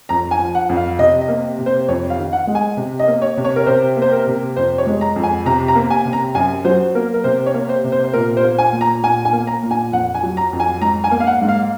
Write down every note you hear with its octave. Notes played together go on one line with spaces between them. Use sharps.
F2 A#5
G#5
F3
F#5
F2
F5
C3 D#5
D#5
A#3
C3
C5
F2 C#5
F5
D#3
F#5
G#3
G#5
C3
D#5
A#3
C#5
C3
C#5
A#4
C3 C5
A#3
C5
A#4
C3
F2 C5
C#5
G#3
A#5
F2
G#5
C3 A#5
A#5
A#3
G#5
C3
A#5
F#2 G#5
F#3 C5
A#3 A#4
A#4
C3 C5
C#5
A#3
C5
C3
C5
C5
A#2 A#4
C5
A#3
G#5
A#2
A#5
A#2 G#5
G#5
A#3
A#5
A#2
G#5
F2 F#5
G#5
F#3
A#5
F2
G#5
G#2 A#5
G#5
A#3
F5
F#5
G#2
F5